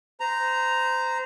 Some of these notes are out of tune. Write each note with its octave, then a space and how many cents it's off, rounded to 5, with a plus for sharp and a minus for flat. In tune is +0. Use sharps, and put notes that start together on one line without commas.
C5 -25 A#5 +0